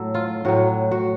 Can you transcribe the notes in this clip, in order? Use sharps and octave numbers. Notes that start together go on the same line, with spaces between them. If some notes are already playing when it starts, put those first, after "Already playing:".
Already playing: A2 F#3 A4
F4
A2 F#3 F#4
F#4